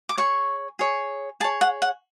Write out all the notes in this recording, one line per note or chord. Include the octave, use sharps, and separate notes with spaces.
D6
G#4 C#5 C#6
G#4 C#5
G#4 C#5 A5
F#5
F#5